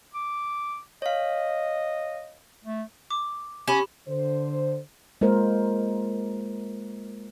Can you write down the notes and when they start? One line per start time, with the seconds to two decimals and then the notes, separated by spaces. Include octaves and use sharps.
0.14 D6
1.02 C#5 D#5 F5
2.65 A3
3.10 D6
3.68 C#4 G4 B5
4.08 D3 C5
5.21 G#3 A#3 F4 A#4 C5